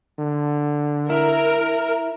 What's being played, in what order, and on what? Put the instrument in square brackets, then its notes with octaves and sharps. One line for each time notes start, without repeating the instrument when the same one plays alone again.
[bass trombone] D3
[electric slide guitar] E4 [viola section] A#4